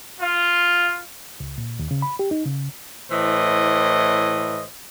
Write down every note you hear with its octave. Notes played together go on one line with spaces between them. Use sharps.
F4
C#2
A#2
D#2
C#3
B5
G4
D#4
C#3
A2 E3 C5 D#5